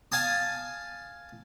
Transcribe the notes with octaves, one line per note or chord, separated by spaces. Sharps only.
F5 G#5 A5 D#6